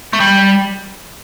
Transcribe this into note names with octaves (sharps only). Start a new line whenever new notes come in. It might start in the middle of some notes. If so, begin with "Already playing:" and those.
A3
G3